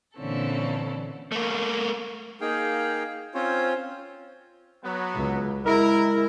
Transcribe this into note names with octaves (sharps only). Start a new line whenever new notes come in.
A#2 D3 E3 C4 C#4 A4
A3 A#3
A#3 D#4 G#4 F5 G5
C4 C#4 F4 C5 C#5
F#3 B3
C#2
G#3 E4 A#4